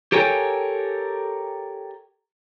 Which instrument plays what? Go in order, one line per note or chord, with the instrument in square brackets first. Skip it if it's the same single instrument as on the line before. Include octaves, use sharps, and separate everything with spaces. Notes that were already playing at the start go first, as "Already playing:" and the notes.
[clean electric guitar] G4 A4 A#4 C#5 G5 G#5